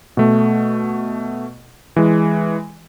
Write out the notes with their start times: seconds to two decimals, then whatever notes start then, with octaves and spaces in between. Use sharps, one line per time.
0.17 B2 A3
1.96 E3 G#3